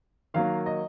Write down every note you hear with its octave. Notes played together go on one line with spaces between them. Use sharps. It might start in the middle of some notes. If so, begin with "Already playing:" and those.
D#3 F#3 A#3 F5
D#5